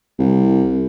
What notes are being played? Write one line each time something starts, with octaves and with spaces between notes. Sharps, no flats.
C2